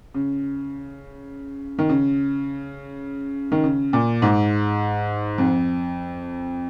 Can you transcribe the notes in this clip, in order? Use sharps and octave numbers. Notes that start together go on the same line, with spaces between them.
C#3
D#3
C#3
D#3
C#3
A#2
G#2
F2